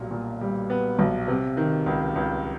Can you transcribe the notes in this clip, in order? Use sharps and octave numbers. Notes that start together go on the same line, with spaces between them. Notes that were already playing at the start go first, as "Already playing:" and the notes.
Already playing: B1 A#2 G3 B3
A#2
G3
B3
B1
C3
D#3
C#2
C#2